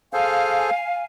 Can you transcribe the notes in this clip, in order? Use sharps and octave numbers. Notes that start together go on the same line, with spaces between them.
G#4 A4 C5 F5 G#5